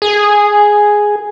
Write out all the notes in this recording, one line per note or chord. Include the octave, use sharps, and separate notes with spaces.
G#4